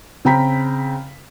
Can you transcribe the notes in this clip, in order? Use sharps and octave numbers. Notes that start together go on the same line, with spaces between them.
C#3 C4 G5 A#5 B5 B6